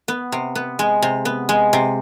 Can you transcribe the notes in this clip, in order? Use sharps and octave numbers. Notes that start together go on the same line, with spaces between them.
B3
C3
B3
G#3
C3
B3
G#3
C3